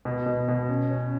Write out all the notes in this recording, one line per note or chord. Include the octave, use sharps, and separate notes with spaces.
B2
B2
B2
C#4
C#4